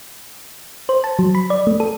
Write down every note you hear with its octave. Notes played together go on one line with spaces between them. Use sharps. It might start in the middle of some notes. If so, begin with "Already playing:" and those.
C5
A5
F#3
B5
D5
A3
A4